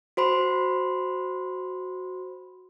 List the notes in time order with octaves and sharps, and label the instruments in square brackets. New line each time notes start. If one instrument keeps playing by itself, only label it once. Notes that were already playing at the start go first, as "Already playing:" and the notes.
[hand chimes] F#4 C5 B5 C6